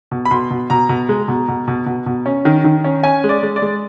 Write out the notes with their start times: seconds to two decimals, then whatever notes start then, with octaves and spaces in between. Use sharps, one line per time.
0.11 B2
0.25 B5
0.31 B2 C6
0.50 B2
0.70 B2 A#5
0.89 B2
1.09 G#3
1.28 B2
1.48 B2
1.68 B2
1.86 B2
2.06 B2
2.26 C#4
2.45 D#3
2.64 D#3
2.84 C#4
3.03 C#4 G#5
3.24 G#3
3.29 D5
3.43 G#3
3.56 D5
3.62 G#3